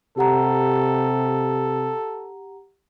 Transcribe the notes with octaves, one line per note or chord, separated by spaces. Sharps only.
C3 G4 A4 F#5 A#5